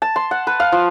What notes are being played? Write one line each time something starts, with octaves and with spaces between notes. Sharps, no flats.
A5
C6
F#5
B4
F5
F3